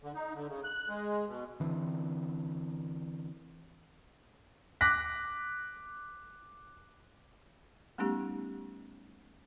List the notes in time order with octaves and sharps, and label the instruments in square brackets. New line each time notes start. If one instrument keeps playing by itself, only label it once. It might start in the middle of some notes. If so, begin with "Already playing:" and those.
[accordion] D3
D#4
D3
C#3
F#6
G#3
B2
[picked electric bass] D3 E3 C4
[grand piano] D6 F#6 A#6 B6
[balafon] G3 A3 B3 C#4 D#4 G4